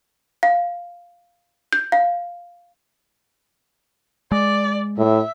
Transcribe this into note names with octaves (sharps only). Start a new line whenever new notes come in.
F5
G6
F5
G#3 D5
A2 E5